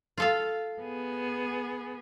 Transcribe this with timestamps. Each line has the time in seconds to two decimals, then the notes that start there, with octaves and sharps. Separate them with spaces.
0.17 F4 A4 F5
0.81 B3 G#4